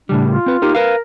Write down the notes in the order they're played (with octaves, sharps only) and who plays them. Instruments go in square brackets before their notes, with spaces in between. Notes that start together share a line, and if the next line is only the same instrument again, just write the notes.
[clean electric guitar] A2 C#3 G3 [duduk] D4
[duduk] F4
[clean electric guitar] C4 B4
D#4 G4 A#4
[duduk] A#4 [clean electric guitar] B4 F5